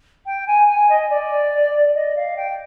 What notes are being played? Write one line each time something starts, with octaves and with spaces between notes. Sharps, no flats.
G5
G#5
G#5
D#5
D5
D#5
F5
G5